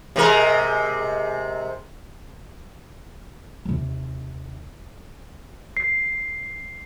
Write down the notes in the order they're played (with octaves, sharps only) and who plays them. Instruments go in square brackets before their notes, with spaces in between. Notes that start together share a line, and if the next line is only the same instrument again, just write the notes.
[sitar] C3 G#3 A#4
[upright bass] D#2 C3
[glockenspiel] C7